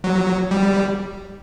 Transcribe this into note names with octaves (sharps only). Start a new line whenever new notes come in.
F#3
G3